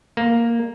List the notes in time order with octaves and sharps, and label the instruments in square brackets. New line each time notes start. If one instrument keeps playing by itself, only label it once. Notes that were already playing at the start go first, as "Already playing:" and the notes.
[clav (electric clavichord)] A#3